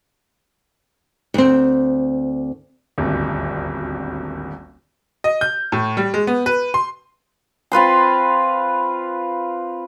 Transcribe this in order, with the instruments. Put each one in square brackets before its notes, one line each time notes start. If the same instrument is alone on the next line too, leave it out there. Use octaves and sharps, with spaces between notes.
[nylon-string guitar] D2 C4
[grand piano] D#1 G#1 D2
[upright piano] D#5
G6
A2
G3
G#3
B3
B4
C6
[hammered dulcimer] C4 F4 B4 C6